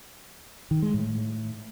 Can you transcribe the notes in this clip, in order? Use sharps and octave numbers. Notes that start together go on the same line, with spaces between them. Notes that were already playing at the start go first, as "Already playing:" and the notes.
D#3
G#3
A2